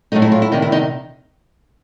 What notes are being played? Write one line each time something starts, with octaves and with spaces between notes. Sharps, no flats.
A2 F#3 A3 D#4
E4
F4
E4
E2 C3 D#3 D#4
E4
D#4